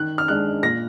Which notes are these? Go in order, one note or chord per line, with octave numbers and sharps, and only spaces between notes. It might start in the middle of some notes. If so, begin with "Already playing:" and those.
Already playing: D#3 F#6
F6
G#3 D4 F#6
A#2 A#6